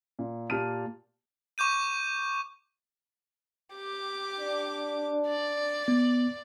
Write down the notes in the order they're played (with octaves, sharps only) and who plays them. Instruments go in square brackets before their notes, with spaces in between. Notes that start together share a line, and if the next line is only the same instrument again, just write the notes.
[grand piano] A#2
A#2 G4 A5 F6 D#7
[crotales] C#6 D6 G6 D#7
[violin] G4 D6
[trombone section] D4
[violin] D5
[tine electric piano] B3